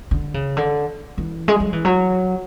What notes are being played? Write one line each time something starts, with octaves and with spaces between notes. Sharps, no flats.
D3
C#3
D3
E3
G#3
F#3
E3
F#3